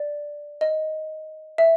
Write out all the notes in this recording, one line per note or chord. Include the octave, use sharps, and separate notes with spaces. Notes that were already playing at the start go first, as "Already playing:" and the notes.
Already playing: D5
D#5
E5